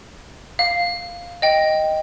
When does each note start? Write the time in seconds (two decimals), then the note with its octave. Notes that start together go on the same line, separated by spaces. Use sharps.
0.59 F5
1.42 D#5 G5